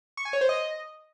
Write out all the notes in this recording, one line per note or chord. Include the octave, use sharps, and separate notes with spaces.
C#6
G#5
C#5
C5
D#5